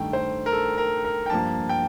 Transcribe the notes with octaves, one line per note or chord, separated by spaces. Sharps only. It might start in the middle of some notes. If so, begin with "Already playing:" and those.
Already playing: G2 D#3 A3 G5
C5
A#4
A4
A#4
A#4
G5
G2 F3 A#3 A5
G5